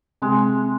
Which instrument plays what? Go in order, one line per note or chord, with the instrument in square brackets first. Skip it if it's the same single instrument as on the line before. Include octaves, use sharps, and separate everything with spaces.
[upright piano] C3 [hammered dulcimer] G#3